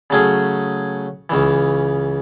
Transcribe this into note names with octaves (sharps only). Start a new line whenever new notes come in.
C#3 F#3 A3 C#4 G#4
C#2 C#3 E3